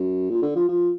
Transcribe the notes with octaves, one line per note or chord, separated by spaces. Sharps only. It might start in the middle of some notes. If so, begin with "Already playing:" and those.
Already playing: F#2
A#2
D3
F3
F3